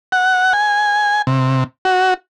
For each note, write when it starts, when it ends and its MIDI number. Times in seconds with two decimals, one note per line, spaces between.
0.12 0.53 78
0.53 1.22 80
1.27 1.64 48
1.85 2.14 66